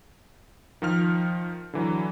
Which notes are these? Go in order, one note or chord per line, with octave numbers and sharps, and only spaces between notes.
D#3 F3 F6
D3 E3 F#3